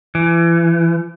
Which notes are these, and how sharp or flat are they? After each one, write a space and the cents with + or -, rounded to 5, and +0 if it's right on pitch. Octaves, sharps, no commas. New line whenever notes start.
E3 +30